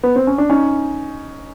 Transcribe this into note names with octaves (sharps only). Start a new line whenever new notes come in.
B3
C4
C#4
D4
C#4 D#4